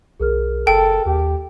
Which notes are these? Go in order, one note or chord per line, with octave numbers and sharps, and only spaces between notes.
B1 G#4 A#4 F6
F#1 A4 G5
D#2 G4